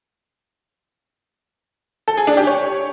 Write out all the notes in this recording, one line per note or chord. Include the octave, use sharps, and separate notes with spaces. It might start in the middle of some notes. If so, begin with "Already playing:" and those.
A4
G#4
D4
G4
C#5